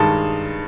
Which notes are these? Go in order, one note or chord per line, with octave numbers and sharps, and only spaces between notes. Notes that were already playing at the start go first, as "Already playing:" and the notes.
Already playing: G2 D#3 G#3 A5